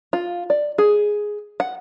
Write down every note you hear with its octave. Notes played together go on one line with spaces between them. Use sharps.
F4
D5
G#4
F#5